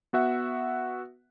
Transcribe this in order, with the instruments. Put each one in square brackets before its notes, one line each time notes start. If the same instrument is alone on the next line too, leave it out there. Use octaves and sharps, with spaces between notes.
[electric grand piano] B3 F#4 E5 F#5